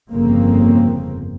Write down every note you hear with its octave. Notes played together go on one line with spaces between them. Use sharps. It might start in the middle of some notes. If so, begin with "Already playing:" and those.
G1 F2 C#3 A#3 C4